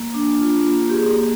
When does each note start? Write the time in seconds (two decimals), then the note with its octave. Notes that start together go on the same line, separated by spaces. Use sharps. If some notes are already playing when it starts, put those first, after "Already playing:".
Already playing: A#3
0.14 D4
0.40 F4
0.68 A#3
0.89 G4
0.94 A#3 G#4